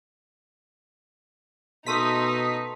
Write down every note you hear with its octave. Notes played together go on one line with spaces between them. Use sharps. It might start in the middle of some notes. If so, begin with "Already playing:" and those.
B2 A3 D#4 C5 A#5 D#6 B6